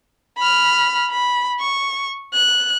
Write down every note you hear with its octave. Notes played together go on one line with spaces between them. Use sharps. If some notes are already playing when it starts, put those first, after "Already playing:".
B5 F6
B5
C#6
F#6